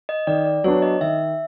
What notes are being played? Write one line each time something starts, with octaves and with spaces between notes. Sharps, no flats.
D#5
D#3 D5
D5
F#3 B3 D4 C#5
D#5
D#3 E5